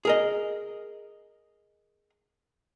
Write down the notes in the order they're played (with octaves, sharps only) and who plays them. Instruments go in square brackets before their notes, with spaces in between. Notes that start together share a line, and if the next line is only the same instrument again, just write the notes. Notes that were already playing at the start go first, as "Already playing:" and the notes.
[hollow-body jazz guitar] G#4 A#4 D#5